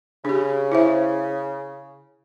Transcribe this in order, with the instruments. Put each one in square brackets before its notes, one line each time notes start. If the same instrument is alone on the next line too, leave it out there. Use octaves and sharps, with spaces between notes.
[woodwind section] C#3 [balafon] D4 G4
[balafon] E4 C5 E5